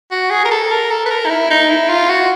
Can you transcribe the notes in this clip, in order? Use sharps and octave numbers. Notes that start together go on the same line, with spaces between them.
F#4
G#4
A#4
A4
A#4
A4
B4
A#4
D#4
E4
D#4
E4
F4
F#4